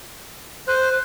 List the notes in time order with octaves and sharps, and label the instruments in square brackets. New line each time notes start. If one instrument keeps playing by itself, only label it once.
[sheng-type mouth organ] C5 [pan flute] F#6